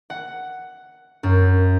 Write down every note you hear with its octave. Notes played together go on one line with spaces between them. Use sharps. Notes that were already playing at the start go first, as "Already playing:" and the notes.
F#5
F#2